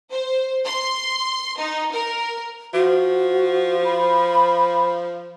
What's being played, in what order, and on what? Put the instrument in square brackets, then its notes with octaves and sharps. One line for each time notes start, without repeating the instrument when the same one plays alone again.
[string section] C5
C6
D#4
A#4
[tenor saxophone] F3 [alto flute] F#4
[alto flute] B5